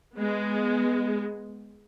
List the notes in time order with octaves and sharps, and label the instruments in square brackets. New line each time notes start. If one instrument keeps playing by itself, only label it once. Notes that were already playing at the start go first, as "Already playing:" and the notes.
[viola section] G#3 B3